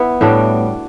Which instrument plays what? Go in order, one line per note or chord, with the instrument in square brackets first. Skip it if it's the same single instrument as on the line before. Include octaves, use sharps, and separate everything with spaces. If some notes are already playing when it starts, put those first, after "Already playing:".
Already playing: [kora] B3 E4
A2 G3 D4 F#4